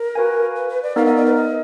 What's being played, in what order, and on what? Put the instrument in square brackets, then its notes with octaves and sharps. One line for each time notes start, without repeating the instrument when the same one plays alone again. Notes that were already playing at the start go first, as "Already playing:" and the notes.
Already playing: [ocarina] A#4
[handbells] F#4 B4 F5 G#5
[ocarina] B4
B4
D5
[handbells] B3 D#4 A#4 [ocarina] F5
[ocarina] D#5
D5
B4
D#5